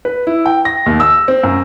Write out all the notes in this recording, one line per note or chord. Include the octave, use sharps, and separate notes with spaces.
B4
E4
G5
A#6
D#2
E6
C4
F#2